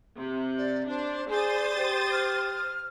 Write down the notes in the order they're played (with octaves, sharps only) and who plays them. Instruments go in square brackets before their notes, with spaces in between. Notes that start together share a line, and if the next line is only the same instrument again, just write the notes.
[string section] C3
[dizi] D5
[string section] D4 [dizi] C5
[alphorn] G#4 [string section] C5 D#6 A6 [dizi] D5
[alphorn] G4
[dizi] F6